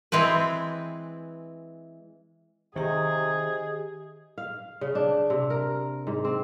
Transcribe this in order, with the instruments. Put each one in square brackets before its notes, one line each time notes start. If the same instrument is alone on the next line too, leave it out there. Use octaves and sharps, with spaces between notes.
[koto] E3 G#3 C4 B4
[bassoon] C3 [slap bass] D#3 [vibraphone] G4 D#5 [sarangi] G#4
[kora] F5
C#3
D4
C3
A#4
G#2
C4